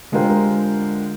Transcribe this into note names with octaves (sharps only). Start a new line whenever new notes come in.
D3 G#3 F4 G4 A#4 C5